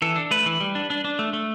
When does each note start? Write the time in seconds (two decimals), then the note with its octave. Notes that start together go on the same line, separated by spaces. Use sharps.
0.02 E3 A4
0.16 D4
0.31 A3 B4
0.46 E3
0.60 G3
0.75 D4
0.90 D4
1.05 D4
1.19 A3
1.33 A3